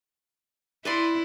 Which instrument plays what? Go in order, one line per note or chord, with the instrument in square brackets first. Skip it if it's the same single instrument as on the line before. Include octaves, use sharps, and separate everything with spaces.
[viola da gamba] E4 [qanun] B4 D5 C6